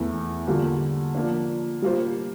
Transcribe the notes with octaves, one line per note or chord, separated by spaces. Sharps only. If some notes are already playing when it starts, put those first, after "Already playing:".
Already playing: E2 E3 A3 E4
D3 G3 A#3 F4
F3 A#3 D4
G3 A#3 F4 C5